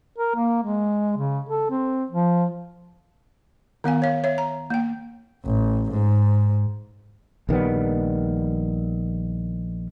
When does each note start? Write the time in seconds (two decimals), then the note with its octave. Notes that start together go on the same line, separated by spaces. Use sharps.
0.18 A#4
0.35 A#3
0.62 G#3
1.17 C#3
1.49 A4
1.70 C4
2.11 F3
3.84 D#3 B3 F5 G#5
4.02 C#5 F5
4.24 C#5 E5
4.38 A#5
4.70 A#3 G5
5.45 A1
5.91 G#2
7.49 A#1 D#3 G3 B3